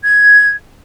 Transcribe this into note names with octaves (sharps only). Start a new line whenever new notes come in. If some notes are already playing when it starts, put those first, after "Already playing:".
G#6